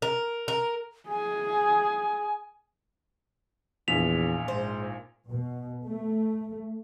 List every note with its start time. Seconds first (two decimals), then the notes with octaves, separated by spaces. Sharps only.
0.02 A#4
0.48 A#4
1.09 G#4 G#5
3.88 A#1 E2 A#2 B6 F7
4.48 G#2 C5
5.28 B2
5.85 A3